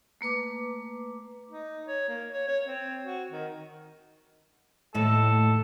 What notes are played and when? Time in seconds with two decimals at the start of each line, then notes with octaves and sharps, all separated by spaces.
0.21 A3 A#3 B4 D6
1.50 D#4
1.87 C#5
2.09 A#3
2.30 C#5
2.48 C#5
2.66 C4
3.03 F#4
3.31 D#3
4.94 D#2 A2 A4